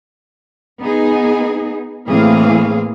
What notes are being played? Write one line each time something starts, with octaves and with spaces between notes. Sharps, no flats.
B3 D#4 G#4
A2 E3 A#3 C4 G#4 F5